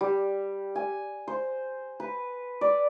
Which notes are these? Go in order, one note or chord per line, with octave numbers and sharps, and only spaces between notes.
G3
G#5
C5
B4
D5